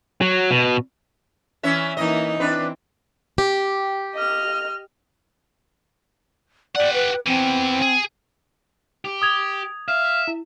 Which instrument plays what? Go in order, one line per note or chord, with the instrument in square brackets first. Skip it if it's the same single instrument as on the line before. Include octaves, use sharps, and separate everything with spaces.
[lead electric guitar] F#3
B2
[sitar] E3 C#4 E5
[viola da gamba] E3 A#3 D#4 [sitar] D#5
[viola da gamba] E3 C4 [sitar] D4 B4
[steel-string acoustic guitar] G4
[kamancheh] D#5 F6
[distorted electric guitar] G4 F#5 [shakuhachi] D5
[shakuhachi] B4
[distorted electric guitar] E2 E3 [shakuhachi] C4
[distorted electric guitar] G#4
[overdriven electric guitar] G4
[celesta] D#6 G#6 F7
[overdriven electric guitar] E5 [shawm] F5
[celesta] E4